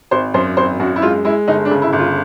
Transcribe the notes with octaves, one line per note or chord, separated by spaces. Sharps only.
G#1 C5
F#2 C5
G#1 C5
F#2 F#4
E4
G#3 F4
G#3 E4
G1 D#4
D4
C#3
E4
G1
F4